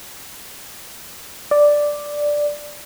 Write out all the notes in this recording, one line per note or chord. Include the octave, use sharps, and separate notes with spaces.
D5